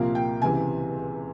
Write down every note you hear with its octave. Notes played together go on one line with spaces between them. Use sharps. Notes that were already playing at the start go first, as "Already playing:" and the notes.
Already playing: C2 A#2 F3 A#3 F5
G5
C#2 C3 E3 G#5